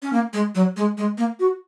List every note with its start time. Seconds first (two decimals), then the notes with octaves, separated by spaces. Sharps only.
0.03 C#4
0.13 A#3
0.33 G#3
0.55 F#3
0.77 G#3
0.98 G#3
1.18 A#3
1.40 F#4